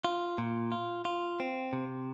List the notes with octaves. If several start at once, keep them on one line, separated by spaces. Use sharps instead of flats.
F4
A#2
F4
F4
C4
C3